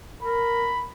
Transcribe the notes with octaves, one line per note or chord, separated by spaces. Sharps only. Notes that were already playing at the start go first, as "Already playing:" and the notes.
A#4 B5